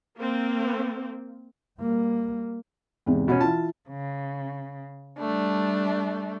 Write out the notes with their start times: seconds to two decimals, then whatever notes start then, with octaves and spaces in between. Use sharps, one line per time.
0.17 A#3 C4
1.79 G3 A#3
3.06 E2 G#2 C3
3.28 B2 C#4
3.41 E3 E4 F4 A5
3.89 C#3
5.19 G3 A3 D4